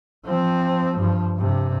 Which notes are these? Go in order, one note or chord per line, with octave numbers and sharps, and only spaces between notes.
F3 C4
G2 F3
G2 C3